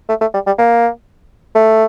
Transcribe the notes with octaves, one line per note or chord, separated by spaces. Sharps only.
A3
A3
G3
G3
A#3
A3